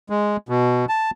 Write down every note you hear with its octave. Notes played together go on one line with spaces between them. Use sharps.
G#3
B2
A5